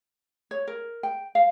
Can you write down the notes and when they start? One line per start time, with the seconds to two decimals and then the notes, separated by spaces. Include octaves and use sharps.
0.51 C#5
0.67 A#4
1.03 G5
1.35 F5